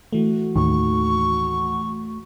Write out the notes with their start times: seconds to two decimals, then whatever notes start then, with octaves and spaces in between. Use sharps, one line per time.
0.13 E3 A3 F#4
0.56 D#2 A2 D#3 C#6